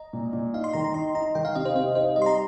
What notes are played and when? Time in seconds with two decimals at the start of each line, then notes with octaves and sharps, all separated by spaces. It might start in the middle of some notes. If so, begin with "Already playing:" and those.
Already playing: D#5 A#5
0.13 A#2
0.33 A#2
0.54 D#4 F5
0.64 C6
0.73 D#3 A#5
0.84 A#5
0.94 D#4 C6
1.15 D#4 A#5
1.35 D#3 G5
1.45 F5
1.55 C3 D#5
1.65 C5
1.75 C3 C5
1.95 D#4 C5
2.16 G3 D#5
2.22 C6
2.26 A#5